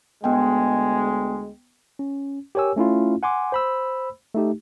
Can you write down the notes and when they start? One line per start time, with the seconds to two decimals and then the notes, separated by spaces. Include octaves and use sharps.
0.24 D2 G#3 B3 G5
1.99 C#4
2.55 G4 A#4 C#5 G#5 E6
2.76 A3 C#4 E4 F4
3.23 F#5 G#5 C6 D6
3.52 C5 B5 E6
4.35 A3 D#4 G4